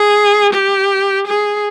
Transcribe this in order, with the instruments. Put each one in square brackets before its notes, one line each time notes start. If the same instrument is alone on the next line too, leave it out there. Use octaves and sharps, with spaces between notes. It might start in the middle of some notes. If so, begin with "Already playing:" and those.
Already playing: [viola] G#4
G4
G#4